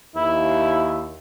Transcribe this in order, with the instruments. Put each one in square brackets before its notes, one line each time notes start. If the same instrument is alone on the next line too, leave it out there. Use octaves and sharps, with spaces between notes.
[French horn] D#2 [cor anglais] E4